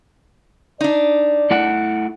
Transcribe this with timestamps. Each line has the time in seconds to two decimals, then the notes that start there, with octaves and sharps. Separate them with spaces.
0.81 D4 D#4 D5
1.51 A3 E4 F#5